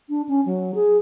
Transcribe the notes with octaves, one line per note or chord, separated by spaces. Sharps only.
D4
C#4
F#3
G#4